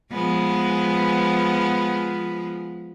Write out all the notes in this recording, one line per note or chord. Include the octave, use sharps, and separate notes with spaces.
F3 G#3 B3